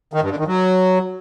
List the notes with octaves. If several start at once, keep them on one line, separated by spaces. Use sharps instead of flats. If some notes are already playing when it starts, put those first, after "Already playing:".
D#3
G2
D3
D#3
F#3